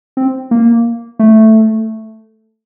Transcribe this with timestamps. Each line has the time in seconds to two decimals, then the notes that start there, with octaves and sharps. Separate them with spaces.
0.17 C4
0.51 A#3
1.19 A3